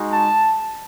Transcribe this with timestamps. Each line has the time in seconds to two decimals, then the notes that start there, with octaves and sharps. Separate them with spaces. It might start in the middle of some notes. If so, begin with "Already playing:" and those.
Already playing: G#3 D#4 F#4
0.11 A5